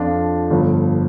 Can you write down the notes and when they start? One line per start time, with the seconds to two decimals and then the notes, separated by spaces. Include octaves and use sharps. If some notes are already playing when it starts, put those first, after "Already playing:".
Already playing: F2 F3 D4 F4
0.50 G1 G2 F3